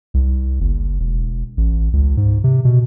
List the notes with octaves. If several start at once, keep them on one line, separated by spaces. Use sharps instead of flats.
C2
F#1
E1
A1
C#2
G#2
C3
B2